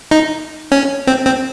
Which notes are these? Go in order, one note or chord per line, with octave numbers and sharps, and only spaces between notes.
D#4
C#4
C4
C4